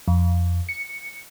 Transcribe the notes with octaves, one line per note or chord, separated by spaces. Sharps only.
F2
C#7